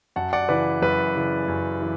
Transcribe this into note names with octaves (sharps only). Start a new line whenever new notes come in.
F#2 F#5 A5
D5 F#5
C#3 E3 B4 D5
F#2 B4
C#3 E3
F#2
E3